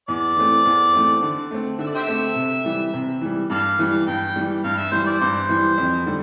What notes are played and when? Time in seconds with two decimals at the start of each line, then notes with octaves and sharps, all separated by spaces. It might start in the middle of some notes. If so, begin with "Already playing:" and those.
0.08 E2 D5
0.37 E3 A3 C4
0.65 E2
0.93 E3 A3 C4
1.22 D3
1.51 A3 C4
1.79 D3 E5
1.86 D5
1.95 G4 C5 E5
2.07 A3 C4
2.35 C3
2.65 E3 G3
2.94 C3
3.21 E3 G3
3.50 G2 A4 D5 F5
3.79 E3 G3
4.06 G2 G5
4.36 E3 G3
4.64 G2 F5
4.77 E5
4.92 E3 G3 C5
5.06 D5
5.21 G2 C5
5.49 E3 G3
5.78 F2
6.06 D3 G3